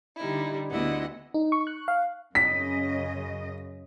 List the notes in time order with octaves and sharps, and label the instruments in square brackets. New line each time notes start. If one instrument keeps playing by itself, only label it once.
[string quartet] D3 G3 D#4 E4
D2 B3 E4 D#5 F#5
[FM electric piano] D#4
C#6
F#6
F5
[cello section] F#2 C#3 D#5 [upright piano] B6